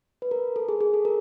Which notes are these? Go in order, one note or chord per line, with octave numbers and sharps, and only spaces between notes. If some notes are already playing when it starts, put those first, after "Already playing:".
B4
A#4
A4
G#4
G#4
A4
A#4